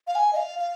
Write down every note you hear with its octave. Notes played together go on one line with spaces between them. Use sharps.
F5
G#5
D#5
F5
F5